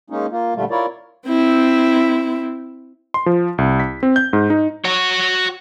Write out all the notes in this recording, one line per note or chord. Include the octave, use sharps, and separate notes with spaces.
G#3 A#3 C#4 D#4
A#3 F4
A#2 D3 G3 A3 F4
E4 F4 A#4 C#5 D5
C4 E4
C6
F3
C2
B6
C4
G6
G#2
D#4
F#4 C#5